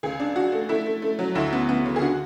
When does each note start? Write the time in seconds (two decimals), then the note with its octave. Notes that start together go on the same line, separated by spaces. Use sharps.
0.03 C#2 G#4
0.20 D4
0.36 D4 F#4
0.52 A3
0.69 A3 E4
0.86 A3
1.02 A3
1.19 F#3
1.35 D2 E4
1.53 B3
1.69 B3
1.86 C#3
1.96 G#4
2.02 D3 F#4